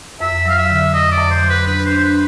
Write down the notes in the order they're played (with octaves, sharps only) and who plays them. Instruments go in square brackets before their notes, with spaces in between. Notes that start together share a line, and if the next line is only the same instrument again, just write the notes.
[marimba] F2 [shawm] E5
[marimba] F#3 [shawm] F5
[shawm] E5
[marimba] D3
[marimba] F2 [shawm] D#5
[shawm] D5
[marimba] F2
[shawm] C5
[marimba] F#3
[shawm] B4
[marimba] D4 [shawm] B4
[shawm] C5
[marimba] D4
[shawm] C5
B4